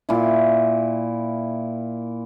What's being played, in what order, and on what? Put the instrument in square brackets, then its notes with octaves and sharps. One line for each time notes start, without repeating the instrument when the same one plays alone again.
[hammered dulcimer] A#2 E4